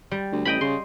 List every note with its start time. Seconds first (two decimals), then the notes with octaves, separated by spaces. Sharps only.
0.11 G3
0.32 D2
0.45 A1 D#5 G5 B5
0.61 C#3 C6